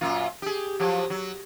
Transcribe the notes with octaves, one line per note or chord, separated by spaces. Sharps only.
F#2 A#2 F4
G4 G#4
F3 F#3 G4
F#3